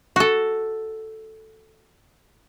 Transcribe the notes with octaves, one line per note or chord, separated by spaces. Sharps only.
F#4 A4